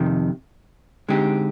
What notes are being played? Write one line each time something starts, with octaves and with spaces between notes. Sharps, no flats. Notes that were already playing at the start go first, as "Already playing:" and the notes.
Already playing: F2 C3 D#3
D3 G#3 C4 D#4 G4